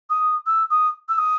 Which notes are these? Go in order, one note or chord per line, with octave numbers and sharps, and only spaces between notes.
D#6
E6
D#6
E6
D#6